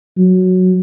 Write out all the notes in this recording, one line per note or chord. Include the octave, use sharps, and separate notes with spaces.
F#3